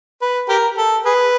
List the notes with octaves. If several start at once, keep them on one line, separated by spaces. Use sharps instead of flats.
B4
G4 A#4
A4
G#4 B4